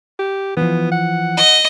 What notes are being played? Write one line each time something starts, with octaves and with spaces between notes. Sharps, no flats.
G4
E3 F3 B3
F#5
D#5